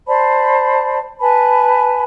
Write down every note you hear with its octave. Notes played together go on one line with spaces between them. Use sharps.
C5 D5 A5 B5
B4 G#5 A5 B5